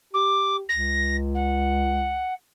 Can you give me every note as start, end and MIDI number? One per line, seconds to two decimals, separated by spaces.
0.13 0.63 67
0.13 0.56 86
0.68 2.24 37
0.68 1.16 94
1.34 2.33 78